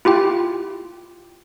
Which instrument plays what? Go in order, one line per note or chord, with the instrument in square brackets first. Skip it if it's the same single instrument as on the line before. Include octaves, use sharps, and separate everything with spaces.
[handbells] E4 F4 G4 G5